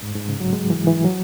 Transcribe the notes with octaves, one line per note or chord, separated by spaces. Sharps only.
G#2
G#2
C#3
F#3
G#3
E3
E3
F#3